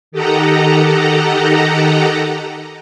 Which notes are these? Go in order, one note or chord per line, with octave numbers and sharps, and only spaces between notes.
D#3 G4 A4 D#5 F#5 A#5